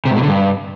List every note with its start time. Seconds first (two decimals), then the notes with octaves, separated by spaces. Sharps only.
0.05 C3
0.11 G#2
0.17 B2
0.22 D3
0.28 G2